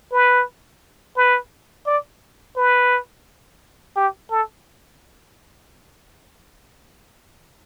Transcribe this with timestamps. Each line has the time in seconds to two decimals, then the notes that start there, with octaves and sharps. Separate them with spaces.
0.12 B4
1.17 B4
1.86 D5
2.56 B4
3.96 G4
4.31 A4